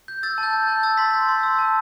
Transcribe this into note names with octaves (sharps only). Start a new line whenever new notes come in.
G6
E6 A6
A5
G6
G6
A6
A5
E6 A6
C6 B6
G6 A6
C6
E6
A5